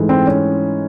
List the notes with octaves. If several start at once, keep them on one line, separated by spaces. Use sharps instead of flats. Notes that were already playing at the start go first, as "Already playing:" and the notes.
Already playing: G#2 E3 A3
C4
C#4